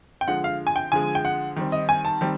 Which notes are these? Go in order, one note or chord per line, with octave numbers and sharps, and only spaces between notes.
G5
D3 F3 G#3 F#5
F5
G#5
G5
D3 F3 G#3 G#5
G5
F#5
D#3 G3 C4
D#5
G#5
A5
D#3 G3 C4